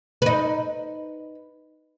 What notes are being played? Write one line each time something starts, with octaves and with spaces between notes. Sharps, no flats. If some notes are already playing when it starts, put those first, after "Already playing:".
D#4 B4